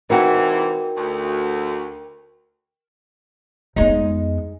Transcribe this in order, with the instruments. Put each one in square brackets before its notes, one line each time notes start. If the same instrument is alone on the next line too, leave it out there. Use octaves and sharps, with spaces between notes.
[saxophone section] G#2 C3 E3 [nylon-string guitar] D#4 F#4 [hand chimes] A#4 G5
[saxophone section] D2
[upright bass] F2 B3 [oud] G#3 D#4